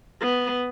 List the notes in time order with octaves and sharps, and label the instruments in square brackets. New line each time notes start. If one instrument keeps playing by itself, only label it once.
[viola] B3